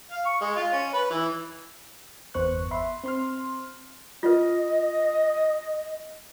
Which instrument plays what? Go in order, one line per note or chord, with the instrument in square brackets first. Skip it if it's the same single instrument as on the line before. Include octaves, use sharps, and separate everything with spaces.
[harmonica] F5
C#6
G#3
F4
C#4
B4
E3
[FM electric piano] G1 E2 B3 C5 C#6 F#6
E5 B5 C6
C4 C6 F6
[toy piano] F4 B4 [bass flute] D#5